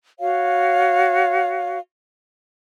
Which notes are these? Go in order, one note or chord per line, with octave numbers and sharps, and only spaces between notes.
F#4 C#5 F5